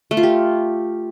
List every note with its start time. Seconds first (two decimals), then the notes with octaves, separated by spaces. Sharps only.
0.11 A3
0.17 F4
0.23 G4